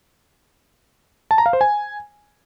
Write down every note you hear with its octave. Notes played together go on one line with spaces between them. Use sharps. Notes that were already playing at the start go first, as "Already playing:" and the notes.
A5
A#5
F5
C5
G#5